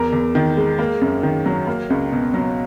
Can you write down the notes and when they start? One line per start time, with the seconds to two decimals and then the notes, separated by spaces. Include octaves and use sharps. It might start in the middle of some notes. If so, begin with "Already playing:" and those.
Already playing: E2 A#4
0.12 E2
0.35 D#3
0.57 G#3
0.78 A#3
1.01 F#2
1.23 D#3
1.46 F#3
1.67 A#3
1.90 C#2
2.12 B2
2.34 F#3